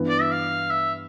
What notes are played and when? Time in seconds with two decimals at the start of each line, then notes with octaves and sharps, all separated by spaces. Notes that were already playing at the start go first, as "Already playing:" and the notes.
Already playing: G2 E3 B3
0.09 D5
0.21 E5
0.32 F5
0.70 E5